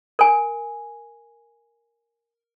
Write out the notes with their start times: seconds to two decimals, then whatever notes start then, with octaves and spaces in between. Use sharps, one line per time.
0.19 A#4 G#5